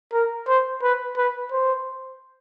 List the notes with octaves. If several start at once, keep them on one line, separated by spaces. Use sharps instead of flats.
A#4
C5
B4
B4
C5